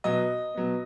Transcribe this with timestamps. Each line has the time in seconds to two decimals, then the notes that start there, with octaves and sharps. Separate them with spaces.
0.04 B2 F#3 B3 D#5
0.55 B2 F#3 B3